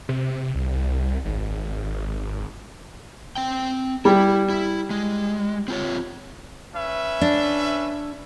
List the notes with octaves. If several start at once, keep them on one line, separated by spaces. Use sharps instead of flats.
C3
C2
G#1
C4 G5
G3 E4
E4
G#3
C4 F4 C#5
C#4 B4 E5
D4